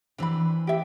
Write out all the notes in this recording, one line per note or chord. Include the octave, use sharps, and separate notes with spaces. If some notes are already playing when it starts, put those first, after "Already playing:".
E3 C4 D4 B4 B5
G4 E5